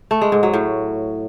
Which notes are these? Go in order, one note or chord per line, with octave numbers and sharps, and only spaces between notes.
A3
G#3
G#2
F#3
A2